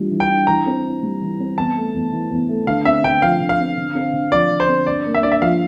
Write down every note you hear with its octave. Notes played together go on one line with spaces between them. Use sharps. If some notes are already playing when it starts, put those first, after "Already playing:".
Already playing: E3 G3 D4 F4
E3
G5
D4
E3 A#5
C4
E4
G3
E3
C4
E2 A5
A3
E2
E3
E2
A3
D3 F5
C4 E5
D3 G5
F3 F5
D3
F5
C4
D3
C4
D3
F3 D5
D3
C5
C4
G2 D5
A#3
E5
D4 D5
E5
F3 F5